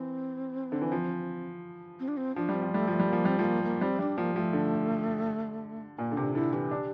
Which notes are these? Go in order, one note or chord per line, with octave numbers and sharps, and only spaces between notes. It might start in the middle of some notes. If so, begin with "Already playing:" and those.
Already playing: E3 C4
D3
E3
F3
C4
D4
C4
F3 D4
G3
C4
F3
G3 A3
F3 A3
G3
F3 A#3
G3 C4
F3 A3
A#3
A#3
G3 C4
G3 D4
F3 A#3
F3 A3
D3
A#2 A#3
D3
C3 D4
D3 E4
E3 G4
D4